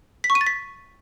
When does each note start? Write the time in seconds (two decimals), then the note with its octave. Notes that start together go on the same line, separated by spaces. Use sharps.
0.24 B6
0.30 C#6
0.35 D#7
0.41 A6
0.46 B6